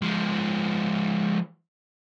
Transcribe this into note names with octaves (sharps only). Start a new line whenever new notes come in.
F3 G#3